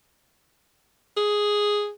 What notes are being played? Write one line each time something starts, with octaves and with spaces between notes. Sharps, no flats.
G#4